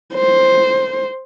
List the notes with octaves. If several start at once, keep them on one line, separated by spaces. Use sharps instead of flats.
C5